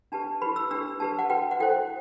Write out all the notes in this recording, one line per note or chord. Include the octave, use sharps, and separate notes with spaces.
D4 G4 B4 A5
E4 G4 B4 B5
E6
D4 G4 B4 E6
D4 G4 B4 A5
F#5
F#4 B4 G5
F#5
E4 A4 C5 G5